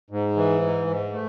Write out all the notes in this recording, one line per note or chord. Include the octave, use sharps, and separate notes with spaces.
G#2
E3
G#2
G#2
A3